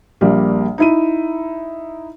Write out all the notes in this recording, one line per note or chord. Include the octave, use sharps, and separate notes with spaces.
A#1 G3 A#3
D#4 E4 D#7